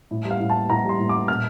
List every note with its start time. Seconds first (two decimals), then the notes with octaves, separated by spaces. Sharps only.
0.11 A2
0.25 G3
0.30 F5
0.40 A2
0.50 A5
0.55 G3
0.70 A2 A#5
0.85 G3 C6
0.99 A2
1.09 D6
1.14 G3
1.28 A#2 F6